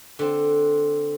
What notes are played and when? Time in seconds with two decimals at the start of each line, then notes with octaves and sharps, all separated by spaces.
0.19 D3 C4